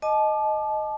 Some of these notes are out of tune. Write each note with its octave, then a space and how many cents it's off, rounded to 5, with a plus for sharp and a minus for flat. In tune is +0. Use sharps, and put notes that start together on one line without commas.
D#5 +0 A5 -30 D6 +30